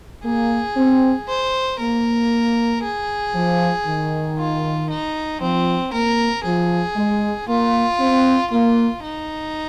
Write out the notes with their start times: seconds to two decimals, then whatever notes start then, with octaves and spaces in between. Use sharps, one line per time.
0.25 A#3 G#4
0.77 C4
1.28 C5
1.80 A#3 A#4
2.83 G#4
3.35 F3
3.87 D#3
4.38 F4
4.90 D#4
5.41 F3 C4
5.93 A#3 A#4
6.45 F3 G#4
6.96 G#3
7.48 A#3 F4
8.00 C4
8.52 A#3 F4
9.03 D#4